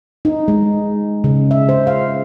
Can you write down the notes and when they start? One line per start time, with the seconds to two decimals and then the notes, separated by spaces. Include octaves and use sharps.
0.25 D#4
0.48 G#3
1.24 C#3
1.51 E5
1.69 C5
1.87 F5